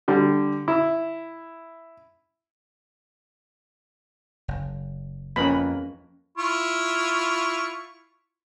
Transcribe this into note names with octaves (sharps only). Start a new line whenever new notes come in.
D3 G3
E4
F#1
F2 A#3 C#4 B4 B5
E4 F4 C#6